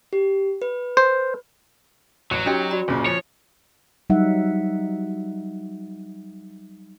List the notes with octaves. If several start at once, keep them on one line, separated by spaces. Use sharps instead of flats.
G4
B4
C5
A1 F#3
C#4 D#4 F#4 G4 D#5
F#4 D5 B5
F#1 A#2 C#3
F3 C#5
F#3 G3 D#4 E5 F#5